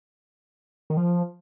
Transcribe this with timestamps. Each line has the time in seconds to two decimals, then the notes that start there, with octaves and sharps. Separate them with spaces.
0.90 D#3
0.97 F3